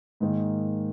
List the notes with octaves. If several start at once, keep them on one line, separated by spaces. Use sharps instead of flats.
G#2 D#3 A#3